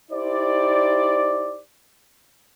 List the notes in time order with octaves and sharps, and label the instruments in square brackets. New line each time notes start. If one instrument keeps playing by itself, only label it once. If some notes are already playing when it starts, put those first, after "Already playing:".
[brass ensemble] D#4 E4 G4 C5 D5